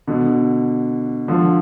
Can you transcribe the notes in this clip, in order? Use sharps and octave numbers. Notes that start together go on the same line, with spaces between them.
B2 D3
D3 F3